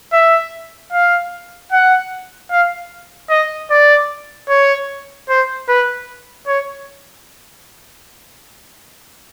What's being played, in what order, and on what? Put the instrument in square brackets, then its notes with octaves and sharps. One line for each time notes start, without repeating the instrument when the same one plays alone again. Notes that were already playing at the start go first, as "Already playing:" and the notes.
[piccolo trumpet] E5
F5
F#5
F5
D#5
D5
C#5
C5
B4
C#5